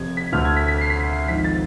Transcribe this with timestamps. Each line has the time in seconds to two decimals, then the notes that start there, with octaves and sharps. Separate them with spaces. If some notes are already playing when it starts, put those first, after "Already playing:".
Already playing: F1 F2 C3 G#6
0.17 B6
0.32 D2 D3 A3 F6
0.45 G#6
0.57 B6
0.68 B6
0.81 C7
0.90 B6
0.97 C7
1.13 C7
1.28 G#1 G#2 F3 B6
1.44 A6